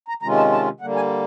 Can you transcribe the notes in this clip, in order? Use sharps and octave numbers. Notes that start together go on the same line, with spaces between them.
A#5
C3 D#3 G#3 C#4 F4 A#5
A5
A5
D3 G3 A#3 F#5
G#5